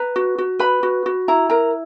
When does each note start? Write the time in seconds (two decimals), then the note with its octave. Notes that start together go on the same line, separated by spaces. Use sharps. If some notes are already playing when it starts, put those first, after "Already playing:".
Already playing: B4 A#5
0.16 F#4
0.38 F#4
0.59 B4 B5
0.83 F#4
1.06 F#4
1.28 E4 A#5
1.50 A#4 A#5